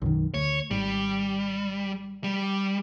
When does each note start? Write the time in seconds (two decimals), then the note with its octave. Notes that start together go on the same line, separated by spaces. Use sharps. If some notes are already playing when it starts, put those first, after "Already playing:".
0.02 B1 F#2 D#3
0.34 D2 C#5
0.71 G#1 G3
2.24 G3